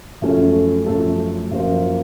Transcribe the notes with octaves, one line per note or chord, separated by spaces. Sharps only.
F#2 F3 A3 C#4 A4
F#2 F3 A3 C#4 A4
F#2 F3 A#3 F4 C5